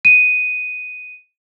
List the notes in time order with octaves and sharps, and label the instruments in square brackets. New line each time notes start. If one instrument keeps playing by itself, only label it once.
[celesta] D#7